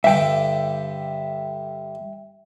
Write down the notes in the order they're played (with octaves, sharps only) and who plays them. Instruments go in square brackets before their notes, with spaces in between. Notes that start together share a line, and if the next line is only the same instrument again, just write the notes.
[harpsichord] G2 D3 [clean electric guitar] E5 G5